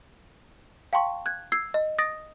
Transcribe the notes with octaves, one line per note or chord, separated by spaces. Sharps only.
F5 G5 A5 C6 C#6
F#6 G#6
E6 G#6 C7
D#5
D#6 A6 A#6 D7